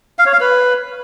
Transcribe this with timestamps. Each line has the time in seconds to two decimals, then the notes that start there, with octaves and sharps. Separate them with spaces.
0.19 F5
0.26 C#5
0.33 F5
0.40 B4